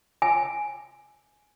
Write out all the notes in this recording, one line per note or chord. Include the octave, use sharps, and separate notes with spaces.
G#5